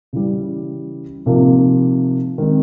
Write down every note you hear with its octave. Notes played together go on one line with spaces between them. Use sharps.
C#3 E3 G3
C3 F3 A#3 D#4
D#3 G#3 C4 D#4